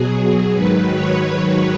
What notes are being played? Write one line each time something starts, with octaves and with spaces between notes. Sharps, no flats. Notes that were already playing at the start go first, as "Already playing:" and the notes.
Already playing: B2 F#3 G#4
G#2 D#3 F#3 B4
C#5